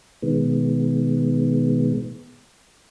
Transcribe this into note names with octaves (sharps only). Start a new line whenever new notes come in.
B2 D#3 G#3 B3